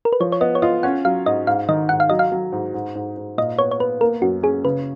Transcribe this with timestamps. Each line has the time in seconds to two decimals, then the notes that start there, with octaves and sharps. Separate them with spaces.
0.05 A#4
0.13 B4
0.20 F3 C#5
0.32 C#5
0.41 B3 D#5
0.55 C#5
0.62 F4 D#5
0.83 C#4 F#5
1.05 F#3 F5
1.26 G#2 D#5
1.47 G#2 F5
1.69 D#3 D#5
1.89 G#2 F#5
2.00 F5
2.10 F#3 D#5
2.19 F5
2.32 F#3
2.52 G#2
2.74 G#2
2.95 G#2
3.17 G#2
3.38 A#2 D#5
3.59 B3 C#5
3.71 C#5
3.80 B3 B4
4.01 A#3 A#4
4.22 F#2 F#4
4.43 C#4 G#4
4.65 C#3 B4